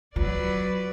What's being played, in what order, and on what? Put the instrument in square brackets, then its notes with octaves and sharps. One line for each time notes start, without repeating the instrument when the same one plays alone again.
[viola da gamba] F#3 B4 D5 [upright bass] F4